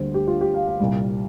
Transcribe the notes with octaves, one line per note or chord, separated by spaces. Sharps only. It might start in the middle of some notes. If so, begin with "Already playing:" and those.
Already playing: D2 D3 G3 A#3 C5
G4
F4
G4
F5
F5
C2 A#2 G3